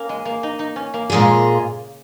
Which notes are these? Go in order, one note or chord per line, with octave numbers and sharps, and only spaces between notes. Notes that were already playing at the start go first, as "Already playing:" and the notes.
Already playing: A#3 C#4
G#3
A#3
D#4
D#4
C#4
A#3
A#2 C#3 G#3 F4 G#4